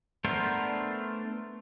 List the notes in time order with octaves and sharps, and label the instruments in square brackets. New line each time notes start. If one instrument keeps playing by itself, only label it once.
[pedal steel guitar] A3 B3 D4 A#4 C5